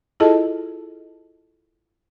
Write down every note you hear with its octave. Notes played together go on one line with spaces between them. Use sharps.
E4 F4 G#4 A4 D#5 A5